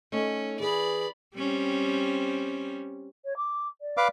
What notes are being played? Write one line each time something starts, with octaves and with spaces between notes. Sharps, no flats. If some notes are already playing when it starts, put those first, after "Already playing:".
A3 C#4 D#4 C#5
E3 G#4 B4 D5 B5
G3 C4 C#4
C#5
D6
D5
B4 F5 D6